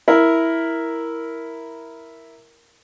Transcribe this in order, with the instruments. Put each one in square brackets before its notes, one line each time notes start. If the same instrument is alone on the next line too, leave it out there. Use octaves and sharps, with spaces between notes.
[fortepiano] E4 A#4